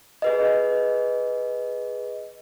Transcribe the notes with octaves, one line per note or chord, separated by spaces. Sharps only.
G#4 B4 D#5